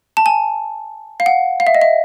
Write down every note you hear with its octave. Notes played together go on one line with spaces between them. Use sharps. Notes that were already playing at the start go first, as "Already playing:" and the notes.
A5
G#5
F5
F#5
F5
E5
D#5
E5